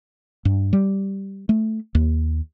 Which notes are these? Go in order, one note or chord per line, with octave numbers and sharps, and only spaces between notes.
G2
G3
A3
D#2